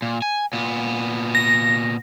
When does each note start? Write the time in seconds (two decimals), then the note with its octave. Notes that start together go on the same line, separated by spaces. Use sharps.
0.02 A#2
0.22 G#5
0.53 A#2 B3
1.35 A#6